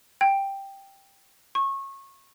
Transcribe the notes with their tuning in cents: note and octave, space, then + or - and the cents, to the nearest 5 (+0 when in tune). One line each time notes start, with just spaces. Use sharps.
G5 +5
C#6 -25